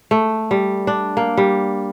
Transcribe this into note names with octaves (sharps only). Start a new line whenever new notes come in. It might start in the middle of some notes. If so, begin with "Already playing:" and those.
A3
G3
D4
A#3
G3